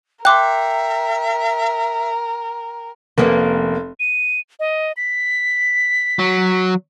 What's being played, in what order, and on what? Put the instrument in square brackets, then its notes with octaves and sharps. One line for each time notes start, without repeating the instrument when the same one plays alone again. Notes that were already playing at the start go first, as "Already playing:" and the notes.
[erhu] A#4 [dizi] E5 [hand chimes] G5 [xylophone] C6 D6 F#6
[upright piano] F1 [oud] A#3 B3 C#4
[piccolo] D#7
D#5
B6
[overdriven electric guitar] F#3